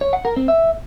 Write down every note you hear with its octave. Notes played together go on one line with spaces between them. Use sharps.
C#5
F#5
A#4
C4
E5